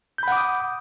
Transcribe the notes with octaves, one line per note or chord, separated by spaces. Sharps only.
F#5 B5 D6 D#6 G6